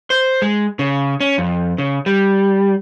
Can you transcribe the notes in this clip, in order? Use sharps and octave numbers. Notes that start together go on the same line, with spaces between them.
C5
G#3
C#3
C#4
F2
C#3
G3